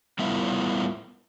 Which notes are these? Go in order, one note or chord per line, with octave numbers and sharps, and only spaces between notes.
G3 B3 E4 F4 A#4 E5